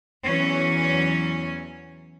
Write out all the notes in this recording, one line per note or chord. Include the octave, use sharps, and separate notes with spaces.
E2 E3 F#3 C#4